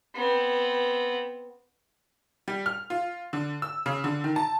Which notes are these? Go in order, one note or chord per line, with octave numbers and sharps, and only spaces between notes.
B3 C4
G3
F6
F4
D3
E6
C#3
D3
D#3
A5